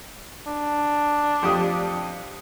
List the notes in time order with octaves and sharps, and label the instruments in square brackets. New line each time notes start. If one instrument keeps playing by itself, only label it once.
[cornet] D4
[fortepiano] F2 G4 D#6